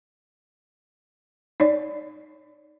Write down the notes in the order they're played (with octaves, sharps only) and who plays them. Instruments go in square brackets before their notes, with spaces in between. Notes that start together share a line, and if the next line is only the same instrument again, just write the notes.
[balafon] D#4 C#5 D5